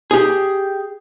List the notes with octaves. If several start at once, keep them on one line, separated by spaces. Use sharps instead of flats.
G4 G#4